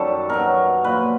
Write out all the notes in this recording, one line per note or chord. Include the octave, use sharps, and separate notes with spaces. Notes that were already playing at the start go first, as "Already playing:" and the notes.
Already playing: F#2 D#3 G3 A4
B2 F#3 A#4
A#2 F3 B4